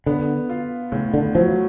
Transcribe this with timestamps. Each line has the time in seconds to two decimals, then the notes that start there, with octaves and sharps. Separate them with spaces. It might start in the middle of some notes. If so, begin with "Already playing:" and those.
0.06 D3 B3
0.50 F4
0.92 A2 C#3
1.14 D3
1.35 F3 F#3